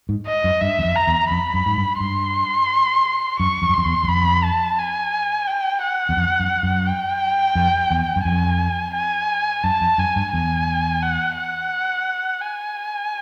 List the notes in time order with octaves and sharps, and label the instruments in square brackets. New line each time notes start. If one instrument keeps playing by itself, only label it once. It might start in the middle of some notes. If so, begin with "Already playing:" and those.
[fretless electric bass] G#2
[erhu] D#5
[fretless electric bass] F#2
[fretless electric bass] G2 [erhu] E5
[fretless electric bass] E2
F2
[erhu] A#5
[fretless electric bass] E2
[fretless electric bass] F2 [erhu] B5
[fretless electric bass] F#2
G#2
G2
[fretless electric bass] G2 [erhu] C6
[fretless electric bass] F#2 [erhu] C#6
[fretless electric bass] F2
F#2
[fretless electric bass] F2 [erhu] C6
[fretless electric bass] E2
E2
[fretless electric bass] F2 [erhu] B5
[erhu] A5
G#5
G5
F#5
[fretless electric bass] E2
F2
F#2
F#2
[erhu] G5
[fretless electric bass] F2
E2
F#2
[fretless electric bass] F2 [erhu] G#5
[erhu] G#5
[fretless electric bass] F#2 [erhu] A5
[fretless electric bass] F2
[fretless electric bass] F#2 [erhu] G#5
[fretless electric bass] G2
[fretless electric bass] E2 [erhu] G#5
[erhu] F#5
F#5
G#5